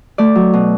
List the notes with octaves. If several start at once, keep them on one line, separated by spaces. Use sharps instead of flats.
A3 D5
F#3
B2